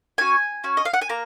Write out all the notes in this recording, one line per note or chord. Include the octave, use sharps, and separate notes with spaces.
C#4 F#4 G#5
C#4 F#4
D#5
F5
F#5
G#5
A#3 A#5